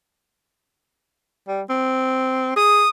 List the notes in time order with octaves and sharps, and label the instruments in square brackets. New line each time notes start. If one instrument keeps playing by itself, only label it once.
[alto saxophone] G3
C4
[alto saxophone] G#4 [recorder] D#6